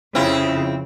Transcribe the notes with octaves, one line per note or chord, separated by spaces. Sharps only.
F2 C#3 C4 E4 F4